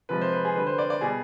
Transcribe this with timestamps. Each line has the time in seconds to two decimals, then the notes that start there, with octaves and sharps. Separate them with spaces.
0.09 C3 F3 G#3 B4
0.21 C5
0.33 B4
0.45 G#4
0.55 D3 G3 B4
0.66 C5
0.78 D5
0.90 D5
1.01 B2 G3 G#4